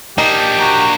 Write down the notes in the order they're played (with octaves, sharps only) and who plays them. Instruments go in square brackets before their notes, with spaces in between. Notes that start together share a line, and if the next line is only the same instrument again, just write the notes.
[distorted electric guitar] A#3 D4 [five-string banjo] D#4 [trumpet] G4
[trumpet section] F#4 A#5